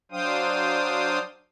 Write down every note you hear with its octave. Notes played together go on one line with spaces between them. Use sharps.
F#3 D4 C5 F5 G5 D#6